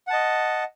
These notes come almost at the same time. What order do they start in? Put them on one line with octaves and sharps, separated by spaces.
F#5 A5 D#5